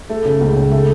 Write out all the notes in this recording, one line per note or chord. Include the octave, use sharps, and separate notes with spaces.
A3
C#3
C#2
C#3
A3